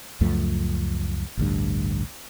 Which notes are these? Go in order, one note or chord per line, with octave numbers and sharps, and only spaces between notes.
C#2 F#2 F3 A3
A1 D2 G2